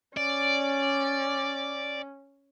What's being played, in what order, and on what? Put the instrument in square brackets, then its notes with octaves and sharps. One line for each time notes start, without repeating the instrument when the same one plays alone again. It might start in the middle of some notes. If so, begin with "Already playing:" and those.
[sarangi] C#4 [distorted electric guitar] D5